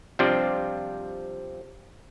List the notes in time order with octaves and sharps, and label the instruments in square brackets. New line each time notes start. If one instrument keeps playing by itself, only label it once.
[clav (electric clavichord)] C3 F3 G3 C4 D4 F4